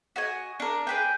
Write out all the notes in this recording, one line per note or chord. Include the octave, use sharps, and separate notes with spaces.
F#4 D#5 G#5
D4 A#4
G#4 B4 G5